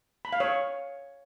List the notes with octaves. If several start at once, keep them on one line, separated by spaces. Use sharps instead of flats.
B5
F5
C#5